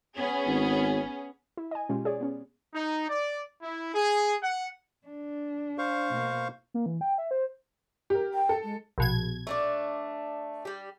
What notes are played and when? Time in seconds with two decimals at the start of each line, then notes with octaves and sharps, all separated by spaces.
0.16 B3 C#4 G#4
0.47 G#1
1.57 E4
1.71 D#5 G#5
1.89 B2 G#3 C#4 F4 G4
2.05 G#4 C#5 D5
2.21 B3 C#4
2.74 D#4
3.08 D5
3.62 E4
3.94 G#4
4.43 F#5
5.07 D4
5.78 C5 F5 C#6
6.10 B2 A#3
6.74 A#3
6.86 E3
7.01 G5
7.18 E5
7.31 C5
8.10 G4 A#4
8.34 G5
8.49 A4
8.64 G#3
8.98 A#1 B2 G#6
9.47 A3 D4 D5
10.65 G3 G4